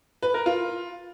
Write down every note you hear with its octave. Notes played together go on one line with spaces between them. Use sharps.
B4
A#4
F4